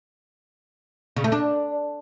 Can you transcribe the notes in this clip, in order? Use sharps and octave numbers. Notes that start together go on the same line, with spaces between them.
C#3
A3
D4